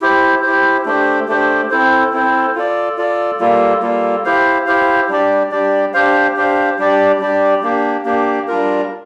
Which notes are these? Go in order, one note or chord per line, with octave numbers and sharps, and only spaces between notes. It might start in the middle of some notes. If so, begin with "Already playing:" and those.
E4 G4 C5
E4 G4 C5
A3 D4 G4 C5
A3 D4 G4 C5
C4 E4 A4 C5
C4 E4 A4 C5
F4 A4 D5
F4 A4 D5
G3 A#3 F4 A4
G3 A#3 F4 A4
E4 G4 C5 F5
E4 G4 C5 F5
G3 D4 G4 D5
G3 D4 G4 D5
D4 G4 C5 F5
D4 G4 C5 F5
G3 D4 G4 D5
G3 D4 G4 D5
A#3 D4 G4
A#3 D4 G4
G3 D4 F4 A#4